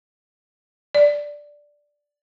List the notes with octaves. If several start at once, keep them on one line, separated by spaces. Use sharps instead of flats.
D5